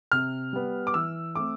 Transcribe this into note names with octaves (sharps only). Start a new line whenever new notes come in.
C3 F6
G3 B3
D6
E3 E6
A3 C4 D6